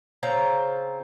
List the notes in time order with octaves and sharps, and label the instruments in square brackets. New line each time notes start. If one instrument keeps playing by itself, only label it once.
[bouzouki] C#3 C4 F4 A#5